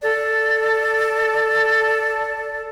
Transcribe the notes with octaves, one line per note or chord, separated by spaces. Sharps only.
A4 D5